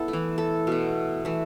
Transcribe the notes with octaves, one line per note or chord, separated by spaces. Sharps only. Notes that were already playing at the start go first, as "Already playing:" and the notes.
Already playing: B3 E4 A4
A3
E3
A4
B2 A3
E3 A3